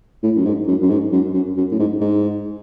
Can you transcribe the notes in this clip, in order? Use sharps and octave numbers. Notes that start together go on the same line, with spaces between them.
A2
F#2
G#2
F#2
F#2
G#2
F#2
F#2
F#2
A2
G#2
G#2